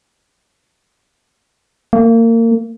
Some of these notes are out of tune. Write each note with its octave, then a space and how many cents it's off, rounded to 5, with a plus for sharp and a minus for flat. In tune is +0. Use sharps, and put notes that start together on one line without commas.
A#3 -30